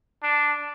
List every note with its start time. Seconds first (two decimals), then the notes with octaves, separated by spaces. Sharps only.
0.23 D4